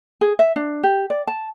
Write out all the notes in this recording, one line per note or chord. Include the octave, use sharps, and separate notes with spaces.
G#4
E5
D4
G4
D5
A5